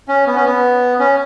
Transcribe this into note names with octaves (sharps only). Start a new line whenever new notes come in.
C#4
B3
C#4
B3
C#4